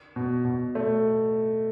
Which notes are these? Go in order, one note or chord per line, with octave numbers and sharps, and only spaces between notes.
B2
B2
A3